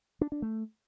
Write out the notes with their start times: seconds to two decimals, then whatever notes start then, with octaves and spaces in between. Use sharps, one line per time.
0.21 D4
0.32 D4
0.42 A3